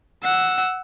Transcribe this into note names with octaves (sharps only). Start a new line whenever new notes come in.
F#5 E6